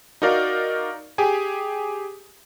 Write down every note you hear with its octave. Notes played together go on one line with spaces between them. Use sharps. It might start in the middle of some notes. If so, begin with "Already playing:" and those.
D#4 F#4 A#4 D5 F5
G4 G#4 G#5